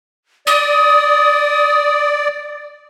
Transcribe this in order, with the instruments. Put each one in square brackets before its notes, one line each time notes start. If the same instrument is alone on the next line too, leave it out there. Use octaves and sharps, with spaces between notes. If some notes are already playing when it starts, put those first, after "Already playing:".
[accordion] D5 [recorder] D#6